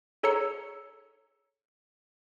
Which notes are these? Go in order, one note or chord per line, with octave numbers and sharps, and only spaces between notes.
G#4 A4 C#5 A#5 E6 C#7